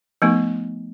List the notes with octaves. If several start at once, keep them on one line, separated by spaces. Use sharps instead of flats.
F3 A3 B3 D#4